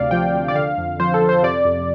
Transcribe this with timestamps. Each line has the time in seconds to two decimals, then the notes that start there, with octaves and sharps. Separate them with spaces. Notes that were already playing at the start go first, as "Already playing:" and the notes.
Already playing: D2 C3 D5 F5
0.11 F3 G5
0.34 D2
0.48 D5
0.55 D3 F5
0.78 F2
1.00 F3 C5
1.14 A4
1.21 F2
1.29 C5
1.43 C3 D5
1.65 F2